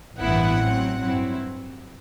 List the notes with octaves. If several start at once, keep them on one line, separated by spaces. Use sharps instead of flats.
A1 G2 E3 B3 E4 F#5
A2 F#3 C4
G2 F#3 C4 E4